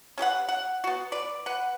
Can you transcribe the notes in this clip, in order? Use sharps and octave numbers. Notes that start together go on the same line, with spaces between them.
C#4 G4 B4 F#5
F#5
B3 F#4
B4 D5
B4 F#5